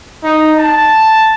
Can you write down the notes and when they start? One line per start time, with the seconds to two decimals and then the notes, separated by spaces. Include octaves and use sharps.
0.24 D#4
0.59 A5